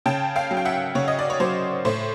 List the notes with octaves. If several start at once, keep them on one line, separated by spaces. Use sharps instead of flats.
C#3 G5 A5
F5 G5
F#3
G5
E5 F#5
C#3 C#5
D#5
D5
C#5
F#3 C5
A2 C5